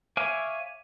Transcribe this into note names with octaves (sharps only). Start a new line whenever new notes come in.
C#5 E5 F5 G#5 D6